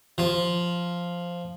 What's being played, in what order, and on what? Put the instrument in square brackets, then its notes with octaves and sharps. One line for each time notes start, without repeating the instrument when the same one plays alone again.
[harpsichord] F3